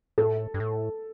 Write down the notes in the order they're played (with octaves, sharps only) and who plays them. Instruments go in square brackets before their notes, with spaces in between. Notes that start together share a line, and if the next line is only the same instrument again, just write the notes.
[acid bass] A2 [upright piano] A4
[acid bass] G2
A2